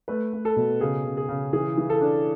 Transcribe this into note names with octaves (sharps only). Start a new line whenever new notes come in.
A3 B4
A3
A4
B2
C#3 G#4
C#3
G#4
C#3
E3 G#4
E3
A4
D4